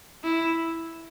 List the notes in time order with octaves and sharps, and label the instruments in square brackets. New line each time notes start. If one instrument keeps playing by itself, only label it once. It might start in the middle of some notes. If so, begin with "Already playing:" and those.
[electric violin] E4